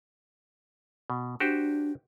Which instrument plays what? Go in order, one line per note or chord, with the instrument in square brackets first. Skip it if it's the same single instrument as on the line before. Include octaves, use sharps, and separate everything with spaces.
[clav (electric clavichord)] B2
[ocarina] D4 [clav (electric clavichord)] F#4 G4 C5